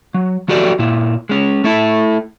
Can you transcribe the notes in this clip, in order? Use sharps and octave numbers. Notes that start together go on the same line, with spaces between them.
F#3
F3 F#3 F#4 G4 A4 D5
A#2 E4
G#3 C#4
A3 E4 A4